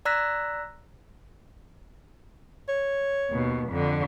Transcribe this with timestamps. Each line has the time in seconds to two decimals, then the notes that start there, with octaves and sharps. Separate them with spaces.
0.05 D5 A#5 E6 F#6 A#6 B6
2.69 C#5
3.29 D#2 B2
3.69 F2 D3